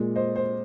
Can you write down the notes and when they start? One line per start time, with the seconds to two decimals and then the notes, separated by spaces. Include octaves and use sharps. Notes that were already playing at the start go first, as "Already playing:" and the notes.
Already playing: A#2 G#3
0.15 C5 D#5
0.36 C5